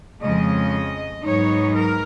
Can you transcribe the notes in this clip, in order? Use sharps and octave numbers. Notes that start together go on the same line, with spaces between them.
F2 C#3 G#3 D#5
G#2 F#3 B3 D#4 C#5
A#4